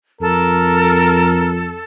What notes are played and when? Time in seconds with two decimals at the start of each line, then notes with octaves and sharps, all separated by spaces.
0.21 F2 A4 A#4